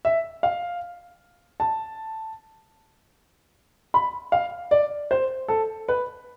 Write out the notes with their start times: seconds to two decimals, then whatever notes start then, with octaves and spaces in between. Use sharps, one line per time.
0.05 E5
0.43 F5
1.60 A5
3.94 B5
4.32 F5
4.71 D5
5.11 C5
5.48 A4
5.88 B4